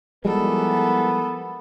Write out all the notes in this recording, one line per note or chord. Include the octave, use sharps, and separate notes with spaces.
E3 F3 G3 G#3 B3 G4 A4 A#4